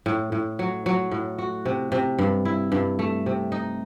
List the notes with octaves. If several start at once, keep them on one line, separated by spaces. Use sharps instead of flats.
A2
A2
F#3
F#3
A2
F#4
C3
C3
G2
E4
G2
A3
C3
D#4